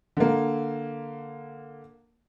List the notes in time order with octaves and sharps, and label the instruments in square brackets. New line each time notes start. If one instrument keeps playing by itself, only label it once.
[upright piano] D3 A#3